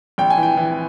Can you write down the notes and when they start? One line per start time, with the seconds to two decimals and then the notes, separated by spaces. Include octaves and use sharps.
0.18 A#1 G5
0.30 G#5
0.37 E3
0.43 G5
0.57 E3